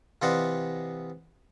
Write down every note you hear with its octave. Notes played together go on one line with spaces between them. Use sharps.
C3 E3 F4 D5 D#5 F#5